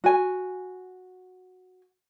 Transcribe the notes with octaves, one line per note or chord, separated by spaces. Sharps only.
F#4 G#5